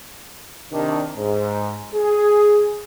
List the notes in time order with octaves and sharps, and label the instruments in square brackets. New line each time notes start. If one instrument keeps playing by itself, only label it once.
[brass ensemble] C3 D#3 D4
G#2
G#4